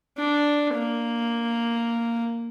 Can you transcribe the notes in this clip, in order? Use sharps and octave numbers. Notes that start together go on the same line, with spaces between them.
D4
A#3